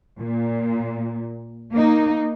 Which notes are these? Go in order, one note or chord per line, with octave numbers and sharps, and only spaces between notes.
A#2
A#3 D#4